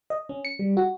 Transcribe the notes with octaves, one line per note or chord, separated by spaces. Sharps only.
D#5
C#4
C#7
G3
F#4